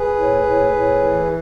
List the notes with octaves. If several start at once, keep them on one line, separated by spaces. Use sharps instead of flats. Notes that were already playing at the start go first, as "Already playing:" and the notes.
Already playing: G#4 B4
A2
A2
A2
E3